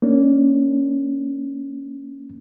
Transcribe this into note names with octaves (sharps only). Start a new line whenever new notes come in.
A#3 C#4 D4